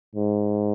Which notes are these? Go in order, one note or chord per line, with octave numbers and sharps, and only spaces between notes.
G#2